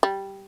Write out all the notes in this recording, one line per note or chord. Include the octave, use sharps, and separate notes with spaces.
G3